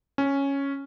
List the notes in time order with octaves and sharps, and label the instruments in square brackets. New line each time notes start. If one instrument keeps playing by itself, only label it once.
[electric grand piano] C#4